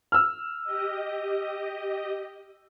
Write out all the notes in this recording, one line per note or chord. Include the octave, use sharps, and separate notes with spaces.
E6 F6
G4 D#5